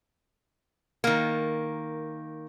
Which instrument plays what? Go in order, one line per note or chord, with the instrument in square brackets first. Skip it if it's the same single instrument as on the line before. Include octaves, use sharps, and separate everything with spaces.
[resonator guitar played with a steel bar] D#3 A#3